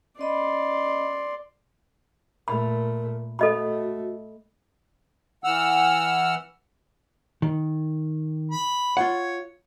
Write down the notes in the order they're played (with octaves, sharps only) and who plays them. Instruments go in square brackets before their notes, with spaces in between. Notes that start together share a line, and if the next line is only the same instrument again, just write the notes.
[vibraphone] C#4 D#5 B5 [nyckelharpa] D5 C6
[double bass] A#2 A3 [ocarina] A#4 [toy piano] B5
[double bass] A3 [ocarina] F#4 [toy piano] A4 D#5 B5
[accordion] E3 F#5 E6 F6
[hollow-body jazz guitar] D#3
[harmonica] B5
[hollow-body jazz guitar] F4 F#5 [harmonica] C#5